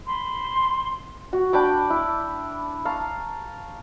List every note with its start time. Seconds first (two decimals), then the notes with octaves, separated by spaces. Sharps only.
0.06 B5 C6
1.33 F#4
1.53 D4 G5 B5 D6
1.90 E4
2.85 F5 A5 A#5 C#6